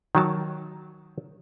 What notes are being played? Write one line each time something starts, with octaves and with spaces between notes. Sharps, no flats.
D#3 F#3 A5